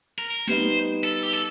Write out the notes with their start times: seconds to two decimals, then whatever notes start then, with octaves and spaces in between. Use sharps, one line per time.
0.18 A#4
0.47 G3 B3 D#4 C5
1.04 A4
1.23 G4
1.33 A4